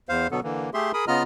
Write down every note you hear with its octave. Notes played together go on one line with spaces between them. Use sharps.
E2 C5 F5
B2 D3 F#3 B3 A4
D3 E3 A#3
A3 G4 G#4 E5 C6
G#4 A#4 B5 D#6
C#3 B3 F4 D#5 A#5 F6